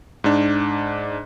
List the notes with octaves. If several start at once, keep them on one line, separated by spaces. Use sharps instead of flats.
G#2 D4